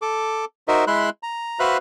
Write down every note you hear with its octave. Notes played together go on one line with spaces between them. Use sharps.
A4 D6
D#4 F#4 A#4 C5 D#5 E5
G#3 E4 E5 B5 C6 F#6
A#5
F#4 B4 C5 E5 F5 F#6